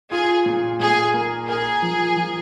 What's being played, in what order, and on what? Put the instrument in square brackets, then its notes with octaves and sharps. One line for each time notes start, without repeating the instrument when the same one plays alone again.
[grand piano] F4 [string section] G#4
[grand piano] A#2
[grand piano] A#2 [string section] G#4
[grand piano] A#3
[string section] G#4 [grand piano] A#4
[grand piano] F3
F3